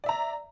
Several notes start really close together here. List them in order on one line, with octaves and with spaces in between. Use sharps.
D5 E5 A#5